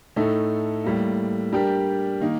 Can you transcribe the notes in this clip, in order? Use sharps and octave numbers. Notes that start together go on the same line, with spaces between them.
A2 A3 D#4 A4
A2 G3 A#3
G3 D4 G4 A#4
D#3 A#3 D#4